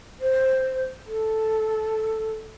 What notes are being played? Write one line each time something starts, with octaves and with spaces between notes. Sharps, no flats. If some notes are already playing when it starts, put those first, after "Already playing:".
C5
A4